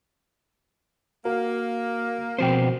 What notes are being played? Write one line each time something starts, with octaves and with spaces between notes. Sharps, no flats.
A#3 F#4 A#4
B2 F3 C4 F#4 C5 G5